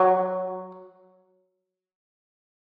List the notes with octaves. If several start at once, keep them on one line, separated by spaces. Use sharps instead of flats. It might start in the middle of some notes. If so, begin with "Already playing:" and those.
Already playing: F#3